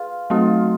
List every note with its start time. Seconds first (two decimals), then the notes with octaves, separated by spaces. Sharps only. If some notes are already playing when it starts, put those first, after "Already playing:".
Already playing: F4 G#4 B4
0.30 F#3 A3 C4 D#4 F4 F#4